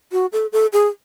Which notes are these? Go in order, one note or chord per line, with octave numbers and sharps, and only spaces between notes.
F#4
A4
A4
G#4